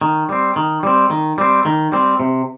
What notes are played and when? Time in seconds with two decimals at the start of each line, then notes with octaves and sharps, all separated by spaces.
0.01 D#3
0.29 G3 C4
0.56 D#3
0.83 G3 C4
1.10 D#3
1.38 G3 C4
1.66 D#3
1.92 G3 C4
2.20 C3